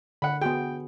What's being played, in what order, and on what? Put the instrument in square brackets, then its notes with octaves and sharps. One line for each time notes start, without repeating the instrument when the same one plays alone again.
[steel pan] D3 [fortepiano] F#5 B5
[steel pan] B3 F#4 G#4 [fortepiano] G5